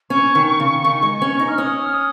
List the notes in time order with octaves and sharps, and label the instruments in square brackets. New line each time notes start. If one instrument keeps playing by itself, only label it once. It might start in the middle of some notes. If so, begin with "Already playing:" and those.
[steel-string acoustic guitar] C#4 [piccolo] C#6
[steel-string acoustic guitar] D#3
C#3
D#3
G#3
C#4
D#4
[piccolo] F6
[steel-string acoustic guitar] C#4 [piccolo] D#6
[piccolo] F6
D#6